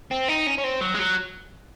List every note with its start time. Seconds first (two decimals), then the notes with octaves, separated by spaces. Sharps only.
0.11 C4
0.28 D#4
0.47 C#4
0.58 C#4
0.64 C4
0.81 F#3
0.94 G#3
0.99 F#3